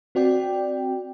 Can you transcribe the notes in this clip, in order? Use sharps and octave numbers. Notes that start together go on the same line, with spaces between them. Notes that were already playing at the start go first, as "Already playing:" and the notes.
C4 F#4 D5 G5